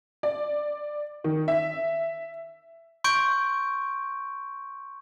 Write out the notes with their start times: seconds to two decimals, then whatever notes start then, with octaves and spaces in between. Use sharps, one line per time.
0.23 D5
1.24 D#3
1.48 E5
3.04 C6 C#6 G6 D7